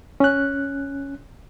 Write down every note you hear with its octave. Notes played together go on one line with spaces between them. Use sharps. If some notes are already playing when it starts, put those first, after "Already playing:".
C#4 F#6